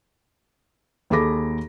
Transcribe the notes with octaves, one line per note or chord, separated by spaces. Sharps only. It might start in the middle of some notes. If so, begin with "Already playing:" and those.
D#2 G#4 A4 B5 D6 A#6